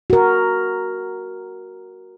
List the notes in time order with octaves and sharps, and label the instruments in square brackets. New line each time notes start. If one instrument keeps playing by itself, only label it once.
[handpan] F#4 A#4